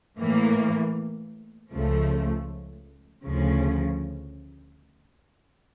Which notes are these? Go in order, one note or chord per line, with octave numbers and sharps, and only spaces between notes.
A2 E3 A#3
C#2 C#3 F3 A3
D2 C#3 F3